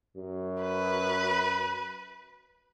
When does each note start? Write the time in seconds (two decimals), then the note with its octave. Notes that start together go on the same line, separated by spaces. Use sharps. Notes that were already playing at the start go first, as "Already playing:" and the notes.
0.17 F#2
0.62 B4